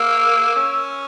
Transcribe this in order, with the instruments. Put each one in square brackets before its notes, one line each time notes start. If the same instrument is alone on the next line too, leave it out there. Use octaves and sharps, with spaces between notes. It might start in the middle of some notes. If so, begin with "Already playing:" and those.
Already playing: [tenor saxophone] A#3 [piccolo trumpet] E6
[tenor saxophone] C#4